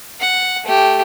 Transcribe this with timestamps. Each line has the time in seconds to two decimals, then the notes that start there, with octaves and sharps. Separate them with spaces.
0.21 F#5
0.65 A3 G4